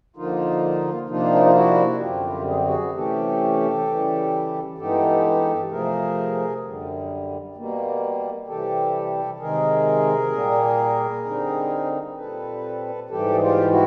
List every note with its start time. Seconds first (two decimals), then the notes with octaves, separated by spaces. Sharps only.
0.16 D3 F3 A#3 D#4 F4
1.08 C3 F3 A#3 D4 D#4 F4
1.35 E4
1.45 F4
1.55 E4 F#4
2.01 F#2 D3 G3 C4 F4 G4
2.48 G#4
2.56 G4
2.65 F#4 G#4
2.93 C3 E3 A3 C#4 G4 A4
3.87 C#3 E3 G3
4.78 G2 E3 G#3 B3 D#4 G4 A4
5.71 C3 F3 A3 G#4 A#4
6.64 F#2 D3 G3
7.55 B2 G3 A#3
8.47 C3 E3 G3 G4 A4
9.40 C3 D#3 G#3 G#4 A#4
10.32 A#2 G3 A#3
11.24 D3 G3 C4 D#4
12.17 A#2 G3 C4 A4 B4
13.09 G#2 E3 G3 G4 A4
13.35 G#4
13.40 F4 G4
13.71 E4 F#4